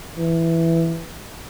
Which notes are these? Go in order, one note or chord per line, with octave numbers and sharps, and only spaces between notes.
E3